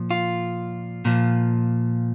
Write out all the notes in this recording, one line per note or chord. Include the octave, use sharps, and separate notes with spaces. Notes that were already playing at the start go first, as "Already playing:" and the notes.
Already playing: A#2 F3
F4
A#2 F3